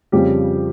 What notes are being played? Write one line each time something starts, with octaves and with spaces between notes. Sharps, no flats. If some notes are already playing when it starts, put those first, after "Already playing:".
F2 C#3 F3 G3 G4